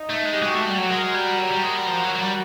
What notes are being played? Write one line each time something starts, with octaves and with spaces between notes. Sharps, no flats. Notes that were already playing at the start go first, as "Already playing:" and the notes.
Already playing: D#4
A3
G#3
G4
G#3 F#4
A3
G3
F#3
G#3 A#4
G3
F#3
G3
G#3
G3
F3
F#3
F#3
G3